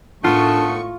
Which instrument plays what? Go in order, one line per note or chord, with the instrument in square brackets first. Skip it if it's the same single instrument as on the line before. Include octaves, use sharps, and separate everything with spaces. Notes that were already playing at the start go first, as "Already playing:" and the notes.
[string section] A2 C#6 C#7 [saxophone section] D#3 A3 B3 [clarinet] D4 [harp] F4